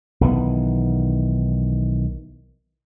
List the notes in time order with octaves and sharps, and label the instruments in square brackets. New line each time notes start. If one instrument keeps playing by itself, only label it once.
[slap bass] B1 D#3 E3 B3